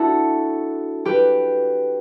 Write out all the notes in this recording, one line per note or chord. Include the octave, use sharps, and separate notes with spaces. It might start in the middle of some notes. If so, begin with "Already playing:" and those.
Already playing: D4 E4 F#4 A4
G4 B4